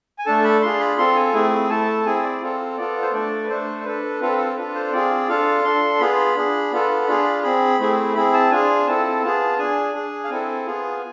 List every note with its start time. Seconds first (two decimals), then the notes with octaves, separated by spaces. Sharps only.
0.18 G#5
0.26 A3 D4 A4 A5
0.44 B5
0.62 D4 F4 G#4 C6
0.80 B5
0.98 C4 F4 A4 C6
1.16 G#5
1.34 A3 C4 E4 G#4
1.69 A3 E4 A4 A5
2.05 C4 E4 G#4 G#5
2.24 D5
2.41 C4 F4 A4
2.77 B3 F4 A4 D5
3.02 C5
3.13 A3 D4 A4 D5
3.44 B4
3.49 A3 D4 A4 C5
3.85 D4 A4 B4
4.21 C4 F4 A4 B4
4.38 A4
4.56 D4 F4 A4 B4
4.75 C5
4.92 C4 F4 G#4 D5
5.28 D4 F4 A4 F5
5.64 D4 A4 C6
6.00 B3 F4 G#4 B5
6.36 D4 G#4
6.72 B3 F4 A4
7.07 D4 F4 G#4
7.43 C4 G#4 B5
7.79 A3 C4 E4 G#4
8.15 C4 E4 G#4 B5
8.33 A5
8.51 D4 F4 G#4 G#5
8.87 C4 E4 A4 A5
9.23 B3 F4 G#4 A5
9.58 D4 G#4 G#5
9.94 D4 G#4
10.24 F5
10.30 C4 E4 A4 G#5
10.66 B3 F4 G#4